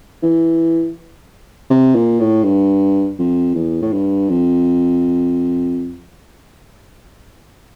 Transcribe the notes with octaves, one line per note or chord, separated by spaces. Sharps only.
E3
C3
A#2
A2
G2
F2
E2
A2
G2
F2